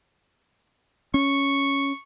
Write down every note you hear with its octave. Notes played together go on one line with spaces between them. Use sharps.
C#4 C#6